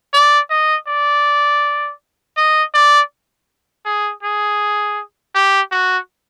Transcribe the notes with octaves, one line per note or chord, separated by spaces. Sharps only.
D5
D#5
D5
D#5
D5
G#4
G#4
G4
F#4